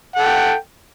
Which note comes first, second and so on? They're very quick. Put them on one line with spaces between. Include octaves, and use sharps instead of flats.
F#5 A4 G5